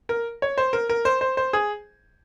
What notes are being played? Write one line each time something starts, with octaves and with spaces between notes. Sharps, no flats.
A#4
C#5
C5
A#4
A#4
C5
C5
C5
G#4